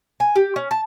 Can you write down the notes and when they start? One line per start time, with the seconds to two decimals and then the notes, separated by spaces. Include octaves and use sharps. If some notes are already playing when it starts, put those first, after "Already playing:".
0.20 G#5
0.36 G4
0.56 C#4
0.71 A5